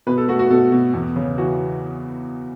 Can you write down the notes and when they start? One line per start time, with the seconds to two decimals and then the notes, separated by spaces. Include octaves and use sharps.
0.07 B2 B4
0.18 A4
0.28 A3 F#4
0.39 F#4
0.50 B2 A4
0.72 B2
0.93 E2
1.16 C#3
1.38 E3 F#4